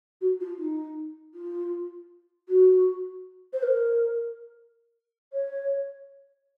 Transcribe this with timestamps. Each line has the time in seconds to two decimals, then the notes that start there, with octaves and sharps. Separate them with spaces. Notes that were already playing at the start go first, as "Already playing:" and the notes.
0.21 F#4
0.40 F4
0.59 D#4
1.34 F4
2.49 F#4
3.53 C5
3.63 A#4
5.33 C#5